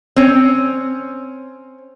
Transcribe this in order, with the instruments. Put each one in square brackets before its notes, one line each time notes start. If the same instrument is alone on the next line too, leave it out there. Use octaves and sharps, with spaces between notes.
[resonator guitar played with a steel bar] C4 C#4